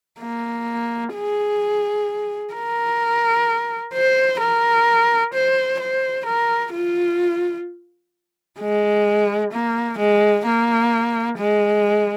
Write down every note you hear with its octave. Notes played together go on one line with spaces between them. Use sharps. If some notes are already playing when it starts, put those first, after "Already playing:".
A#3
G#4
A#4
C5
A#4
C5
C5
A#4
F4
G#3
A#3
G#3
A#3
G#3